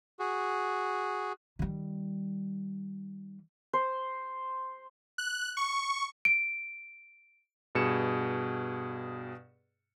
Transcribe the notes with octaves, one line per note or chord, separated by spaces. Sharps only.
F#4 G#4
D#3 G3
C5
F#6
C#6
D7
G2 B2 G#4 C#7 E7